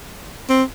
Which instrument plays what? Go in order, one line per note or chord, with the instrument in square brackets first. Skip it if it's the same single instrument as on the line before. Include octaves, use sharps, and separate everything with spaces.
[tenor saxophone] C4